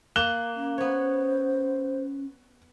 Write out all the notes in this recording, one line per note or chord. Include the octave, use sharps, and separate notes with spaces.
A#3 F#6 E7 G7
C#4
B3 C5 C#5